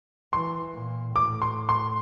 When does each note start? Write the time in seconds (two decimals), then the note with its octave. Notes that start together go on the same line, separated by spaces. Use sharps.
0.33 E3 C6
0.75 A#2
1.15 A2 D6
1.42 C6
1.69 C6